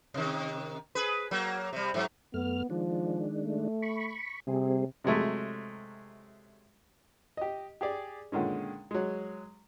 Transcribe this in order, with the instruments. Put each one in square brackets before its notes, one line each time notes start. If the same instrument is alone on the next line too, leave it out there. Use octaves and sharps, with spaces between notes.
[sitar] C3 D#3
G#4 B4
F#3 A#3
C3 G3
G#2 F#3
[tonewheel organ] F#2 A3 F6 [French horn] B3
[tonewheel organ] D#3 G#3 D4 [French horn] F3
[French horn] A3
[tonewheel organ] B5 C#6
[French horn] C3 [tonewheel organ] G3 C4 G#4
[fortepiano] C3 F#3 G#3 A3
G4 D#5
G4 G#4 D5
A#2 D3 D#3 G#3 C#4
F#3 G#3